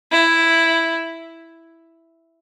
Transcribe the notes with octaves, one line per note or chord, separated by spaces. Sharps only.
E4